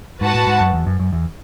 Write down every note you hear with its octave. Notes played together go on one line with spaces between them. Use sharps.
G#2 F#4 B4 F#5 A5
A2
G#2
F#2
E2
F#2
F#2
E2